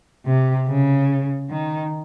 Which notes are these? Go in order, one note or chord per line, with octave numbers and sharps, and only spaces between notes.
C3
C#3
D#3